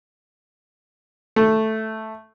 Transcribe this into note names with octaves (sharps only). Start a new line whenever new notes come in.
A3